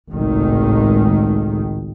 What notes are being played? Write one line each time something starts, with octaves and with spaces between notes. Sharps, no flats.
G#1 C#2 A2 D#3